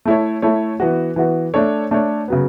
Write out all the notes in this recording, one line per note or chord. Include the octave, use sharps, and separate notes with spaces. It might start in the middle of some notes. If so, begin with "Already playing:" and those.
A3 E4 A4 C#5
A3 E4 A4 C#5
E3 B3 F#4
E3 B3 F#4
A3 D4 A4 C#5
A3 D4 A4 C#5
C#3 F#3 B3